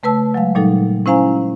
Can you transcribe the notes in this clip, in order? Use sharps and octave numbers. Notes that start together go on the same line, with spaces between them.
C#3 A3 B4 A5 E6
F#3 G#3 F5
A#2 F#3 G3 D#4 A4
C#4 E4 C5 F5 G#5 A#5